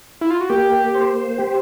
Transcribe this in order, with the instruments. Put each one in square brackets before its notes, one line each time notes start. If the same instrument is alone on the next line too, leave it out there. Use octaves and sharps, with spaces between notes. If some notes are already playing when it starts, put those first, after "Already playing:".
[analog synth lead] E4
F4
F#4
[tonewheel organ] A#3 [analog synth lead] G4
[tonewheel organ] C5
G4